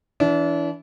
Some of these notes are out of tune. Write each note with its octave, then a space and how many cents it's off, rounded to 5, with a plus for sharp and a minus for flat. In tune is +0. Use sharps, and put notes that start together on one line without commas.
E3 +0 D4 -35 E5 +0